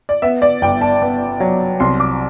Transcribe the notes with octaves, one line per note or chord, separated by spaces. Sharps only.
D5
B3 E5
D5
G1 G5
A5
B3
F#3
C2 C6
D6